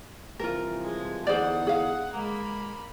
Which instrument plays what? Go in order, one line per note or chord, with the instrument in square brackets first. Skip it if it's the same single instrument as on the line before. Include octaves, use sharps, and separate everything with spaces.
[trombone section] C2 E3 F3 [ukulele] F4 A#4
[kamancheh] G#3
[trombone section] E2 D3 D#4 [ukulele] G#4 C5 D5 [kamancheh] F#5
[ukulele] G#4 F5
[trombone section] G#3 [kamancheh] A#3 B5